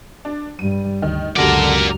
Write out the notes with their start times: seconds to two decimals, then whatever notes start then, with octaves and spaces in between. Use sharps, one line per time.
0.25 D4
0.59 G2 G3 D#7
1.02 D2 D#3
1.36 C#2 F#2 D3 G3 D4 F#4 A#4 D5